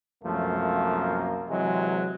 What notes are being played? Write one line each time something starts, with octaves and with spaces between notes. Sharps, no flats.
C2 F#2 F3 A3 A#3
C3 E3 F#3 G#3